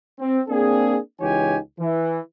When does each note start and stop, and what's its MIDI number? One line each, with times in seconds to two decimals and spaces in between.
0.20 0.40 60
0.49 0.99 58
0.49 0.99 60
0.49 0.99 62
0.49 0.99 68
1.21 1.58 37
1.21 1.58 52
1.21 1.58 63
1.21 1.58 67
1.21 1.58 73
1.21 1.58 80
1.80 2.21 52